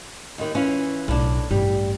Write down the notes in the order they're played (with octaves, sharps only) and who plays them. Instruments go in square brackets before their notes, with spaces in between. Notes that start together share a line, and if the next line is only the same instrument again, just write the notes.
[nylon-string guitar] D#2 D#3
E3 C#4 F4
[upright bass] B1 [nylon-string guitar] A2 D4
[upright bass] A1 G2 [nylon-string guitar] G3